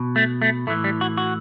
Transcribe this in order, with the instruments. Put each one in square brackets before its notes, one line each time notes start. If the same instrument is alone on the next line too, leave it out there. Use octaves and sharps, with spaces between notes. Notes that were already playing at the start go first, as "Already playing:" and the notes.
Already playing: [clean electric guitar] B2
A3
A3
A2 E3 A3
G3
F#4
F#4